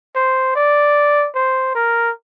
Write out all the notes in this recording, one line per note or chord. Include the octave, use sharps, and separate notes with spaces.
C5
D5
C5
A#4